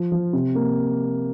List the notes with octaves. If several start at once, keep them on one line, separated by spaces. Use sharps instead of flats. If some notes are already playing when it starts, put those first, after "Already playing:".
Already playing: F3
F3
C3
A#3